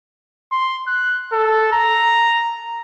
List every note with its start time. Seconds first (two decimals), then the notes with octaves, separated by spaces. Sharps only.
0.52 C6
0.87 F#6
1.33 A4
1.72 A#5